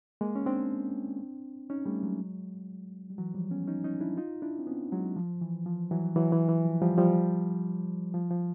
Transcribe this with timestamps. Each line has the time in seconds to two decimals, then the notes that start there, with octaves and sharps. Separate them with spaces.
0.21 G#3 A#3
0.36 C#4
0.46 C4 D4
1.70 C#4 D#4
1.86 G3 A3
2.02 F#3 G#3
3.10 G3
3.18 E3 F#3
3.34 F3 G3
3.51 B3 C#4
3.68 C#4 D#4
3.84 C#4 D#4
4.01 D4 E4
4.17 D#4 F4
4.42 D4 E4
4.59 C4
4.67 B3 C#4
4.92 F#3 G#3
5.16 F3
5.42 E3
5.66 F3
5.91 E3 F#3
6.16 E3 F#3
6.32 E3
6.49 E3
6.65 F3
6.82 F3 G3
6.98 F3 G3
8.14 F3
8.30 F3